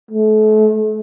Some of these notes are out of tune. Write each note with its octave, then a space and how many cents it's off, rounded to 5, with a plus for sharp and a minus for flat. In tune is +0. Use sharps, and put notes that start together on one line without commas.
A3 -35